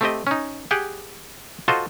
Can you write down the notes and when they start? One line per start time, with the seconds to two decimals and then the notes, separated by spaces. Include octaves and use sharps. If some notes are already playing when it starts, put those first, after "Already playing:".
0.01 A3 C4 G4 D#5
0.27 C#4 D#4
0.71 G4 G#4 F#5 G5
1.68 F4 F#4 A4 C5 D#5